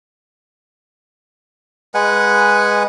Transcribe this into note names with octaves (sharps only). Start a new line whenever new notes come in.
G#3 B4 F#5 G#5